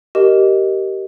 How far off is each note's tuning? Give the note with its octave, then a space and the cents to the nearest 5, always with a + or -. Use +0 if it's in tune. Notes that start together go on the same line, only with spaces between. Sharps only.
G4 -20 A#4 +0 D#5 +0